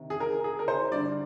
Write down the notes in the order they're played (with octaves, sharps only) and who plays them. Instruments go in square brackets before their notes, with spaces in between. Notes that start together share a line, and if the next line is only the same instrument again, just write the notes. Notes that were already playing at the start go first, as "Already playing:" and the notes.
Already playing: [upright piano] C3 D#3
G#4
A#4
G#4
A#4
C5
G2 D3 D5